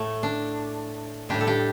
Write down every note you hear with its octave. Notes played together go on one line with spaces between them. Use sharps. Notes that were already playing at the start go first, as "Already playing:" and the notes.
Already playing: A2 A3
D4
A2 G3 D4 G4
A4
D4 G4